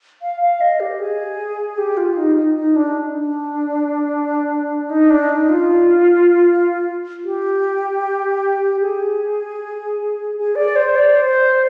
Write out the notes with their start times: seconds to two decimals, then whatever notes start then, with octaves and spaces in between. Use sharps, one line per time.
0.22 F5
0.41 F5
0.61 D#5
0.80 G4
0.99 G#4
1.78 G4
1.97 F4
2.17 D#4
2.36 D#4
2.55 D#4
2.76 D4
3.14 D4
4.90 D#4
5.10 D4
5.29 D#4
5.49 F4
7.25 G4
8.81 G#4
10.37 G#4
10.55 D5
10.76 C5
10.96 D5
11.15 C5